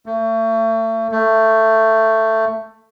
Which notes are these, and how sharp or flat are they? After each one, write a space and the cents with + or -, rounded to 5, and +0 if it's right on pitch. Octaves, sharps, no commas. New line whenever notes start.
A3 +35
A3 +15